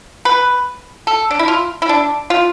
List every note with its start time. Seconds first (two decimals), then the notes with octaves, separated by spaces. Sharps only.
0.25 B4
1.07 A4
1.31 D4
1.39 E4
1.48 F4
1.82 E4
1.89 D4
2.30 F4